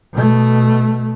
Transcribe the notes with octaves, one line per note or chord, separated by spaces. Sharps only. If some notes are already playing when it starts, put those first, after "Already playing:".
B2 A3